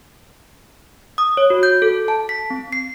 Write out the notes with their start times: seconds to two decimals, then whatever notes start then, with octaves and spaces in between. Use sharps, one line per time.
1.18 D#6
1.37 C#5
1.50 F#4
1.63 G6
1.82 A4
2.08 A5
2.29 B6
2.50 C4
2.73 C7